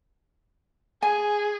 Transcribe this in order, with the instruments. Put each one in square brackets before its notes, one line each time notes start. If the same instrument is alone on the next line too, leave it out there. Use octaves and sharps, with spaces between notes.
[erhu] G#4 [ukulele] G#5